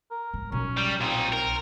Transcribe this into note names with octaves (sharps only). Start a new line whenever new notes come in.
A#4
G#2
B1 C#4
G3
A#2 C4 D#4
A#4